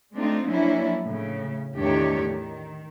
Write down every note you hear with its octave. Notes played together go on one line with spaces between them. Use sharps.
G#3 A3 C4 D4 D#4 F4
F3 F#3 A#3 C#4 D4 E4
A2 C#3
E2 A2 D#3 D4 G4 C#5
D#3